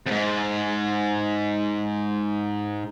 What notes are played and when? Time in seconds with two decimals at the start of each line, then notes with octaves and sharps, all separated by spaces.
0.07 F2 G#2